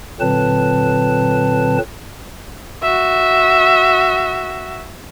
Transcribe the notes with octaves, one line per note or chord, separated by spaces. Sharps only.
A#2 D3 F#3 C4 B4 A5
F#4 E5